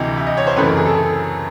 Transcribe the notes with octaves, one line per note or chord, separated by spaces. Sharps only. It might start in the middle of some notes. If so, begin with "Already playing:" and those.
Already playing: D2 C3 E3 D#5
E5
D#5
C#5
C5
F#2 C#3 E3 A3 C4 B4
A#4
G#4
A4